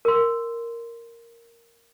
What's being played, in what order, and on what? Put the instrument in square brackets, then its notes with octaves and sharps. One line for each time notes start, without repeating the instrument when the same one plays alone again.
[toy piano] A#4 C6